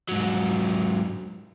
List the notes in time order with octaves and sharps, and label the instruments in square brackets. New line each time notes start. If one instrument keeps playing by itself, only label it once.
[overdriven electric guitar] G#2 F#3